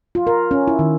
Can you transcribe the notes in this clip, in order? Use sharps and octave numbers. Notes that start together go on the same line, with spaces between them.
F4
A#4
C#4
E4
D#3